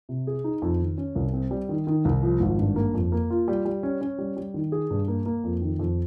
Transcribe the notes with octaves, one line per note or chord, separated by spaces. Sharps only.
C3
G#4
D#4
F2
D#3
C#4
C2
C4
G3
D#3
D#3
C2
F3
G#1
G2
A#3
F2
A#3
F4
G3
G3
C#4
C#4
G3
G3
D#3
G#4
G2
A#3
A#3
F2
D#3
F2